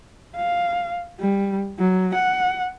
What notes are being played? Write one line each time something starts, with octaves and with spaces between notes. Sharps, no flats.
F5
G3
F#3
F#5